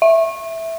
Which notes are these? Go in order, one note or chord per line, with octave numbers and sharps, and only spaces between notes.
E5